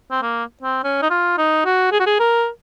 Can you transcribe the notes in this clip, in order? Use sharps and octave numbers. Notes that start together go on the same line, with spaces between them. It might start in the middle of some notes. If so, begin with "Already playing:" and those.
C4
A#3
C4
C#4
D#4
F4
D#4
F#4
G#4
F#4
G#4
A#4